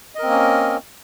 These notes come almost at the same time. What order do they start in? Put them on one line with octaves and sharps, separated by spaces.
D#5 A#4 C4 A#3 C#4